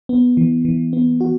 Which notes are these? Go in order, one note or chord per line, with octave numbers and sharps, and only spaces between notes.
B3
E3
E3
B3
F#4